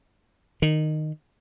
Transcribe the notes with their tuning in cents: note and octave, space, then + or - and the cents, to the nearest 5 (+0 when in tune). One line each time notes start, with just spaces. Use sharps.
D#3 -15